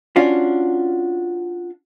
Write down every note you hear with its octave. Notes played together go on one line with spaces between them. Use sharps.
C#4 D4 F4 F#4